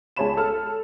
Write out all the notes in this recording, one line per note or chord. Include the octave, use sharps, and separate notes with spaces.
C#2 G#4 C#5 A5 B5 E7
A4 A5 F6